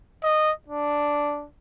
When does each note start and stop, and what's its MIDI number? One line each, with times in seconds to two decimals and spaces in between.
0.24 0.52 75
0.68 1.46 62